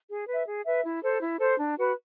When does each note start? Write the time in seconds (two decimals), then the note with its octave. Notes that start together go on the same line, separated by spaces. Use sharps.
0.09 G#4
0.28 B4 E5
0.47 G#4
0.66 B4 E5
0.85 E4
1.03 A4 C5
1.22 E4
1.40 A4 C5
1.58 D4
1.77 F#4 B4